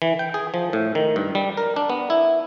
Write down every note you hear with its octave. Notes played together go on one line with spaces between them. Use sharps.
E3
G5
G#4
F3
A2
D#3
G2
G3
A#4
D4
B3
E4